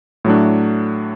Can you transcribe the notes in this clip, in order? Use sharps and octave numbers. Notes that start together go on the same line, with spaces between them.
A2 F#3 A3 D4